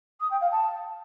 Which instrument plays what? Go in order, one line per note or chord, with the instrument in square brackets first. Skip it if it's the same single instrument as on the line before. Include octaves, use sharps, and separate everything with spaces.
[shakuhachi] D#6
G5
F5
A5